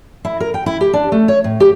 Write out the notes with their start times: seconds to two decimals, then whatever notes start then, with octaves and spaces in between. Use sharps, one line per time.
0.25 E4
0.40 A#4
0.54 G5
0.66 E4
0.81 G4
0.93 D4
1.12 A3
1.28 C#5
1.44 A2
1.60 G4